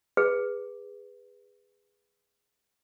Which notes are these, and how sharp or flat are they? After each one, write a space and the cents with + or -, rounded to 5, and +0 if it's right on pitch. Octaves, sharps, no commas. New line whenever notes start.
G#4 -20 B4 +0